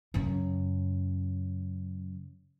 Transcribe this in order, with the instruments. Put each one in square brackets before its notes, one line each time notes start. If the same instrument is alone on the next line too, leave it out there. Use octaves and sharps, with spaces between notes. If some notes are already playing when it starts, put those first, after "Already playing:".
[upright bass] F#2 C#3